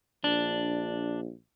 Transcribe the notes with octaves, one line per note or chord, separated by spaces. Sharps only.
A#1 D4